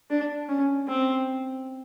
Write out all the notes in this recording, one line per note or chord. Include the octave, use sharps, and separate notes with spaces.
D4
C#4
C4